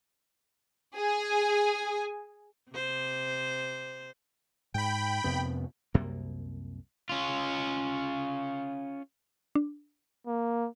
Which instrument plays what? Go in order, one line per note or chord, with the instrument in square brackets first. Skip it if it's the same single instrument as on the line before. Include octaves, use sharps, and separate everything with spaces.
[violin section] G#4 G#5
[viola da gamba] C3 C5
[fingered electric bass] G#2 [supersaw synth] G5 B5
[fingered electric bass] F2 C3 B3
[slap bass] C2 F#2 C3 A#3
[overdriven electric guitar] C#4 F4
[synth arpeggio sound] D4
[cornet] A#3